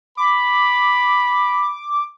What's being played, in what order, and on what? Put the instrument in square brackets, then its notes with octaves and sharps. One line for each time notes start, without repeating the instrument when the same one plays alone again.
[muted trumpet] B5 [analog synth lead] D6